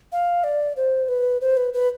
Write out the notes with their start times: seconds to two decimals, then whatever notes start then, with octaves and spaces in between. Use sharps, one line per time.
0.12 F5
0.44 D5
0.77 C5
1.09 B4
1.41 C5
1.57 B4
1.74 B4